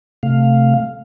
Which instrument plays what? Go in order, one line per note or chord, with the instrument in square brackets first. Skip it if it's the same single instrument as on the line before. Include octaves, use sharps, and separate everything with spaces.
[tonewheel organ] C3 A3 F5